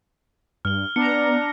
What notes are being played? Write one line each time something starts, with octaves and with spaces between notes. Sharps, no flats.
G2 F6 G7
B3 D4 A#5 C#7